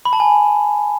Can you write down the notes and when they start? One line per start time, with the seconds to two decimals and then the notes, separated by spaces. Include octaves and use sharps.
0.05 B5
0.13 A5
0.20 G#5